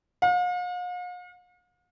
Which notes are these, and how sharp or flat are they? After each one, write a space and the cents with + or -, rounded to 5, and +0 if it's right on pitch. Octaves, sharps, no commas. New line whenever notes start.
F5 +45